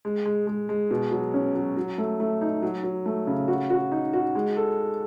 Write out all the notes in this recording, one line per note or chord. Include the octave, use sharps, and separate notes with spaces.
G#3
G#3
G#3
G#3
B2
F#3
C#4
F#3
F#3
A3
A3
D#4
F#3
F#3
A3
C#3
F#4
F#4
D#4
F#4
G#3
A4